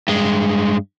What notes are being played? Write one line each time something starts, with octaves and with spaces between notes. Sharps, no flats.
G2 G#3